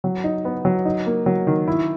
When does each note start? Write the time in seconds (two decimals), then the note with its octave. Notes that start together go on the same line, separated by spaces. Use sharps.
0.04 F#3
0.24 D#4
0.45 B3
0.65 F#3
0.85 D#4
1.06 A#3
1.26 F#3
1.47 D#3
1.68 E4